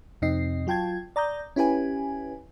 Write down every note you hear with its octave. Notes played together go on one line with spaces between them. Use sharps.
F2 C3 C4 D#4 D#5 C7
F#3 F4 G5 A5 G#6
D5 A#5 D#6 G6
C#4 E4 G4 B4 G#5